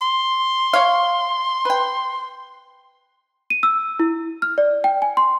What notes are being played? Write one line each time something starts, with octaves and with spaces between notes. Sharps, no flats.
C6
C#5 F5
B4 G5
D#7
E6
E4
F6
D5
G5
G#5
C6